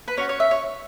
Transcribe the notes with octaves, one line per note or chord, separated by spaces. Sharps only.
B4
C#4 F#4 C#5
C#5
E5
C#5